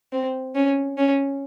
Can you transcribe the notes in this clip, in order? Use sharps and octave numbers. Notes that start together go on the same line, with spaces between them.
C4
C#4
C#4